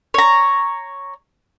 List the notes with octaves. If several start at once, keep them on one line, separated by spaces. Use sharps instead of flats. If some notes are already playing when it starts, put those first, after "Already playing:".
C#5 A#5